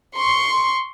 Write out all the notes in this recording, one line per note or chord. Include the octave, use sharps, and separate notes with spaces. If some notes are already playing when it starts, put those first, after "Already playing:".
C6 C#6